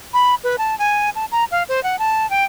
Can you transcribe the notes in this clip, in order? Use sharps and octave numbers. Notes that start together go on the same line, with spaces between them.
B5
B4
A5
G#5
A5
A#5
F5
C5
F#5
A5
G5